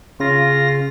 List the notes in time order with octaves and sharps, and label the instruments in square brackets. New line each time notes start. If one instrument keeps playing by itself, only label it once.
[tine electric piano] C#3 [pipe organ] F4 A#6